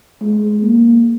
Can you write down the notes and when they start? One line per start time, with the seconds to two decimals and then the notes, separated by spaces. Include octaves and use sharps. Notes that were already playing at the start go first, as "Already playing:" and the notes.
0.21 G#3
0.62 A#3